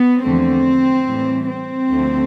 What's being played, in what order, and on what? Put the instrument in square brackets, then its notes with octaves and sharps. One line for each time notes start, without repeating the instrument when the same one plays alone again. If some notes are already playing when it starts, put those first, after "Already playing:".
Already playing: [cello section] B3
E2 D3 F3 A3 C4
A2 E3 G3
C4
D2 D3 F3 A3